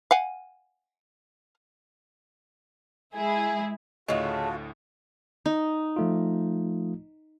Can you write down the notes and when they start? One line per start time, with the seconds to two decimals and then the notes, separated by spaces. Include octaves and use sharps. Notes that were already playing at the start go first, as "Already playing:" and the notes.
0.11 F5 F#5 G#5
3.16 G#3 E4 G#4
4.08 D2 A2 C#3 A3 F4 F#4 D#5
5.46 D#4
5.96 F3 A3 F4